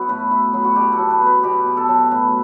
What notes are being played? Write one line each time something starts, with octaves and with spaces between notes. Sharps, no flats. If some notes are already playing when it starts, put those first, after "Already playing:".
Already playing: F#3 B3 E4 F#4
A2 B4
E4
F#3
F#4
B2 G4
A4
F#3
B4
B3 B4
B2 G4
B2
A4
F#3
A2 B4